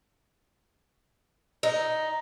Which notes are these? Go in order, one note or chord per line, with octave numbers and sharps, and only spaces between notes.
D#4